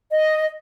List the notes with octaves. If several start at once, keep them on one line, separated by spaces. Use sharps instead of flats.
D#5